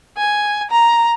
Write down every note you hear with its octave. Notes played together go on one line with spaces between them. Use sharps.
G#5
A#5